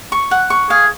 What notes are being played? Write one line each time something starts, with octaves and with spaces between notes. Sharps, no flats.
C#6
F#5
C#6
G#4 F5